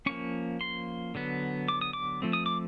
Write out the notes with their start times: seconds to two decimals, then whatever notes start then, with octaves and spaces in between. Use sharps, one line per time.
0.06 F3 A#3 C#4 C#6
0.61 C6
1.15 D3 F#3 B3
1.68 D6
1.81 D#6
1.93 D6
2.22 F3 A3 C4
2.33 D#6
2.46 D6